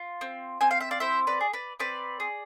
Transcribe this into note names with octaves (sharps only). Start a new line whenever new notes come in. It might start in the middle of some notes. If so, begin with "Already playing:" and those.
Already playing: F4
C4
C4 G#5
F5
E5
D5 F5
E4 C5 E5
B4 D5
G#4
B4 D5
C4 B4 D5
G#4